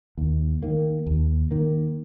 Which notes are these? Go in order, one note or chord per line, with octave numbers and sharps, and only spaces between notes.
D#2
D#3 A#3
D#2
D#3 A#3